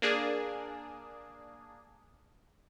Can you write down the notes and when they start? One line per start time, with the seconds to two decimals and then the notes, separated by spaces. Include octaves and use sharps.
0.02 A#3 D4 G#4